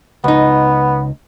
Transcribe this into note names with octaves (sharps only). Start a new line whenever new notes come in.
C#2 B3 D#4